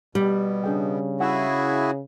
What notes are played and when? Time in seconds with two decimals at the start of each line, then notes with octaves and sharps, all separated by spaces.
0.15 B2 G3 G4 D5
0.64 C#3 D4 G#4 G5
1.20 E4 F#4 G#4 F#5 G#5 E6